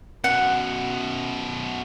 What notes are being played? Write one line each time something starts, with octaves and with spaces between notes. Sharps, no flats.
F#2 B2 F#5